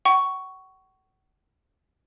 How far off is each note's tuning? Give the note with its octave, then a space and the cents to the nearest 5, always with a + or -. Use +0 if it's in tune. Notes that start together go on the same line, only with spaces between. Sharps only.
F#5 +40 C#6 +5